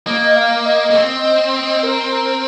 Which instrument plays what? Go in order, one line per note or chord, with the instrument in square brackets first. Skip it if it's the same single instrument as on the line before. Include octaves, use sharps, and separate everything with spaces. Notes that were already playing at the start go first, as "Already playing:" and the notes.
[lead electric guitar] A#3 [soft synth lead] D#5
[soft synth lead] F5
D#5
[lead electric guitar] A#3
C4
[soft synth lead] A#4
A#4